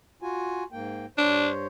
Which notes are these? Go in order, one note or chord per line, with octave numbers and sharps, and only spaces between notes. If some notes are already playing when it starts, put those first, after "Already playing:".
F4 F#4 G#5
G#2 A#3 G5
G2 D4 C5 C#5